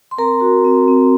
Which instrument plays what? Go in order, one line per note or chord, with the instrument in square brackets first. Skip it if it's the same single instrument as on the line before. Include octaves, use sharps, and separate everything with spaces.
[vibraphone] C6
C4 A#4 A#5
F#4
C4
C4